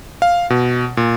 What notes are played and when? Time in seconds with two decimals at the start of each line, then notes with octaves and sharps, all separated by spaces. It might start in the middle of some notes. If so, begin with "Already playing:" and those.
0.22 F5
0.50 B2
0.97 A#2